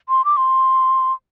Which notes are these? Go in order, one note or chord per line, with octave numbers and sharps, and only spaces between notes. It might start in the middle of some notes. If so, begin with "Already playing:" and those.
C6
D6
C6